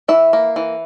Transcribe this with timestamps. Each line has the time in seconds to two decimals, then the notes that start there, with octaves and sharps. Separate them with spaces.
0.08 E3 E4 E5
0.33 A#3
0.56 E3